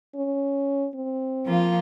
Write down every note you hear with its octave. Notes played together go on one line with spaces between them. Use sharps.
C#4
C4
F3 A#3 F4